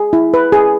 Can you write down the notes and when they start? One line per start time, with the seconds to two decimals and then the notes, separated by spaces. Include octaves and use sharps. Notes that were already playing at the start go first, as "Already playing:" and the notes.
Already playing: G#4
0.13 E4
0.34 B4
0.52 G#4